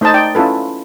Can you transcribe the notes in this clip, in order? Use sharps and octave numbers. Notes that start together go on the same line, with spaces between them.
A3 D#4 C5 D#5 A5
D#4 D5 G5
C#4 E4 F4 A4 B4